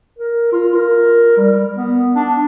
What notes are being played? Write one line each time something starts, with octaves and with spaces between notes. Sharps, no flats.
A#4
F4
A#4
G3
B3
D4